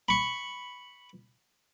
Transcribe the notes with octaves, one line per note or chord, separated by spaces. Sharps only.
B5 C#6